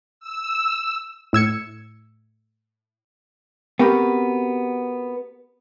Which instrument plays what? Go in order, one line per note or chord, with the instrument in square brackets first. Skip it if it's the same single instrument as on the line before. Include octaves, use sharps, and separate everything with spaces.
[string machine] E6
[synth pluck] A2 E6 G#6 C#7
[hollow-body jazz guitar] B3 C4 F#4 G4 A#4 B5